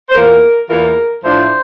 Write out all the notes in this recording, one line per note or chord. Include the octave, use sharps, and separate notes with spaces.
C5
E2 E3 A#3 F4 A#4
E2 E3 A#3 F4 A#4
A2 F3 A3 D4 F4 C5